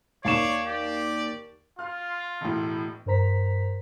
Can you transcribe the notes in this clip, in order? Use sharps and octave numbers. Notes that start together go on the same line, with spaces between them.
D#2 C#5 D5 F5 C#6 E7
G4 D5
F4 F5 F6
E1 A2
G2 A#4 C5 A#5 B6